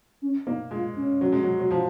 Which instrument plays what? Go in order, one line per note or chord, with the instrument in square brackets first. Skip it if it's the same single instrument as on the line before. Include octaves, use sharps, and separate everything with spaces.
[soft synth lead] C#4
[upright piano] A#3 [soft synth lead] D#4
[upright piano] G#3 [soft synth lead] F4
[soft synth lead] C#4
[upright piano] F#3
G#3
F#3
F#3
F3